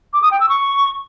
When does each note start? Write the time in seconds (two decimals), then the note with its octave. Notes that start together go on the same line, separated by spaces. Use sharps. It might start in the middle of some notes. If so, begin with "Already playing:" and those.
0.13 D6
0.22 D#6
0.31 G5
0.40 E6
0.49 C#6